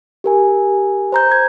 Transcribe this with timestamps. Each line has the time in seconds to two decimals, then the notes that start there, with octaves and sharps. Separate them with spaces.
0.24 G4 A#4 G#5
1.12 C5 A#5 G6
1.32 G#6